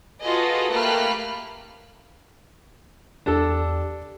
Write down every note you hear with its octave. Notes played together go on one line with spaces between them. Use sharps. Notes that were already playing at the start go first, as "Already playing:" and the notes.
F4 F#4 G#4 A4 B4 D#5
A3 A#3 G4 B5 F6 F#6
E2 D4 G4 A4 D5